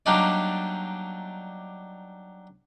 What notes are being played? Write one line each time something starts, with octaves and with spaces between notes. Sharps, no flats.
F#3 G3 A#3 D4 D#4 D5